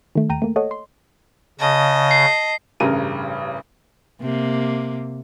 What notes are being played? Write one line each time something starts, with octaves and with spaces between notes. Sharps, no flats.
D#3 A3
D#2 G5 A#5 D#7
A3 A#3
A4 C#5 D#5 F#5
C6
C#3 D#5 A5
C7
A1 G2 C#3 A#4 D#7
C3 A#3